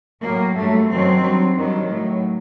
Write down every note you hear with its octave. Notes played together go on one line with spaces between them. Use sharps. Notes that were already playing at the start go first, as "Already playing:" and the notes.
A2 F#3 A#3
G2 F#3 A3
F#2 D#3 F#3 C4
G2 F#3
G2 D#3 F#3
A2 F#3